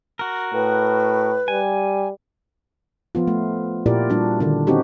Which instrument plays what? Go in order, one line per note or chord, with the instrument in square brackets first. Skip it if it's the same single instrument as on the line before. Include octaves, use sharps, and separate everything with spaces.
[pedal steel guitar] F#4 A#4
[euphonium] A2 [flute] B4
[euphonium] G3 [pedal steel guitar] G#5
[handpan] F3 B3 F4
A3
A#2 E4 F4 G4 A#4 D5
G3 D4 F#4
D3 D#3 D4
C4 C#4 D#4 F#4 G4